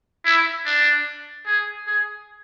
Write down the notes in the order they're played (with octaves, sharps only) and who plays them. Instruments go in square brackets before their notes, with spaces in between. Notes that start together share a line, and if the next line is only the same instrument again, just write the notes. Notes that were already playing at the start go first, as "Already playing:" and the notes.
[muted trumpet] E4
D4
G#4
G#4